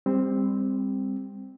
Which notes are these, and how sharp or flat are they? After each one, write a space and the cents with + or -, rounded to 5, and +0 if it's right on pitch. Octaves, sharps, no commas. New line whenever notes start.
G3 +30 C4 +0